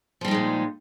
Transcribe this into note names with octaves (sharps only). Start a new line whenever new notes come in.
A#2 F3 G3 G#3 D#4